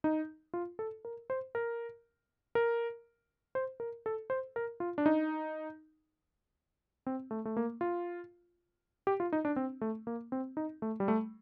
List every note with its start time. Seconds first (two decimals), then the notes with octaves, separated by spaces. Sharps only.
0.04 D#4
0.54 F4
0.79 A4
1.05 A#4
1.30 C5
1.55 A#4
2.55 A#4
3.55 C5
3.80 A#4
4.06 A4
4.30 C5
4.56 A#4
4.80 F4
4.98 D4
5.06 D#4
7.06 C4
7.31 A3
7.45 A3
7.57 A#3
7.81 F4
9.07 G4
9.20 F4
9.32 D#4
9.45 D4
9.56 C4
9.81 A3
10.07 A#3
10.32 C4
10.57 D#4
10.82 A3
11.00 G3
11.08 A3